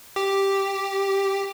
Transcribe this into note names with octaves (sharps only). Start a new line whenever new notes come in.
G4